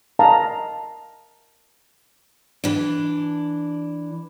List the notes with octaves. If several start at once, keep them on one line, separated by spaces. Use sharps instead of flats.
A#4 D#5 F5 A5 A#5
E3 D4